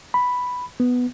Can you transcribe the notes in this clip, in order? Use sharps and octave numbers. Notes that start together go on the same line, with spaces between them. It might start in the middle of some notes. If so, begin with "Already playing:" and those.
B5
B3